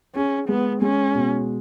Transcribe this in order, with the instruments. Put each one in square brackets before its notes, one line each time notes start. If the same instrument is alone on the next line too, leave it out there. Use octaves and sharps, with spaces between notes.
[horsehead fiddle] C#4 [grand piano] G#4
[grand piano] G#3 [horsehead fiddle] B3
[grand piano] G#3 [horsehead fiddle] C#4
[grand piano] B2